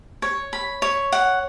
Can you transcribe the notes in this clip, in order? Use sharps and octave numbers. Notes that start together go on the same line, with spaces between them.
C#5
B5
C#5
F#5